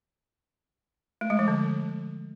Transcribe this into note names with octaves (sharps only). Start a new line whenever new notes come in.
A3
G#3
F3
D3